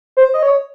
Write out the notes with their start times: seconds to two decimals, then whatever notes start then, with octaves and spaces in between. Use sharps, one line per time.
0.17 C5
0.34 D#5
0.43 C#5